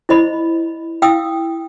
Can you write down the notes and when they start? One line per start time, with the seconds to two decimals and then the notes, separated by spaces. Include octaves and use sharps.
0.09 E4 C5 D#5 B5
1.02 E4 F5 G5 D#6 E6